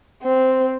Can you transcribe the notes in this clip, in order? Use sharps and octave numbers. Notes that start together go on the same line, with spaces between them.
C4 C5